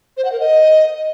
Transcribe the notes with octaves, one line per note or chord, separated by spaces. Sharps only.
C5
F#5
A#4
D#5